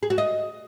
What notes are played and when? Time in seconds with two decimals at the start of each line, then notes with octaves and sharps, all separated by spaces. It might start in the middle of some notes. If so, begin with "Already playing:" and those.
0.03 G#4
0.10 F#4
0.18 D#5